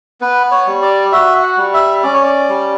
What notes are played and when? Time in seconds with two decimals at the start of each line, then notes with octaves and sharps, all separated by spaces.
0.21 B3 B4
0.51 C#5
0.67 G3
0.82 D5
1.12 F#4 E5
1.43 F#5
1.57 G3
1.74 E5
2.03 C#4 D5
2.14 C#5
2.23 D5
2.49 G3